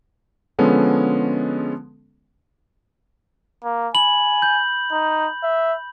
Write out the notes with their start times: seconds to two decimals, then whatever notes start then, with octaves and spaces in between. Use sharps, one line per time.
0.59 D3 F3 G#3 B3 C#4 A4
3.64 A#3
3.95 G#5 B5 F#7
4.42 G6
4.92 D#4
5.43 E5